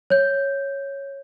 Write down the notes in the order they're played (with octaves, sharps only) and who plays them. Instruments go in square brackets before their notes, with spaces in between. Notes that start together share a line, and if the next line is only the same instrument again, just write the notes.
[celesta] C#5 G6